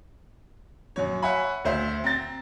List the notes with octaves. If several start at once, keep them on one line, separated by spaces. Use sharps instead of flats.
F#2 F#3 C#5
C#5 E5 F#5 G#5 B5
D2 C5 E5
C4 A#5 A6